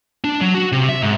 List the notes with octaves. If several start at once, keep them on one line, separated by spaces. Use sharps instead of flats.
D4
F#3
F#4
C3
E5
G#2